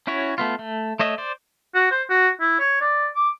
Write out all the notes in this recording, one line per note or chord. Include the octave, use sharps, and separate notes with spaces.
C#4 E4 F#4 C#5
A3 B3 F4
A3
A3 C#5 D#5 E5
C5 D5
F#4
C5
F#4
E4
C#5
D5
D6